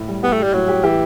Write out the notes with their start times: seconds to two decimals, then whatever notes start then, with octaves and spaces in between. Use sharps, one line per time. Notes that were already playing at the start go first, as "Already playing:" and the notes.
Already playing: A2
0.08 G3
0.23 B3 G4
0.33 A3
0.38 G3 G4
0.53 A2 F#3
0.68 G4
0.83 E3 G4